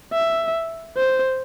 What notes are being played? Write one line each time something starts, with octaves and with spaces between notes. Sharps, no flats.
E5
C5